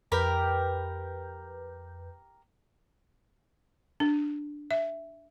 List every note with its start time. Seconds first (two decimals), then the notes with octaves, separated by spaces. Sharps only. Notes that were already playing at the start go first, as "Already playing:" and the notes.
0.12 F2 G4 A#4 B4 B5 G6
4.00 D4
4.71 E5